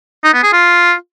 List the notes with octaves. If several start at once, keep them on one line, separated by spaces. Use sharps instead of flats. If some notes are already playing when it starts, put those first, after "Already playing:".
D#4
B3
G#4
F4